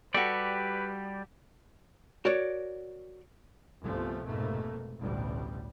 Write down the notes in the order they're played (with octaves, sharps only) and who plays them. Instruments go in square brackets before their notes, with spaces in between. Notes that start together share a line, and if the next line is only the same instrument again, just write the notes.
[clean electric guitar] G3 D5 [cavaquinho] F#4 G4 A4 [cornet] B4
[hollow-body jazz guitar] F#4 A#4 C#5 D5
[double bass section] G1 C2 C3 F3 A3
F1 G#2 B2 A3 A#3
A1 D2 B2 G3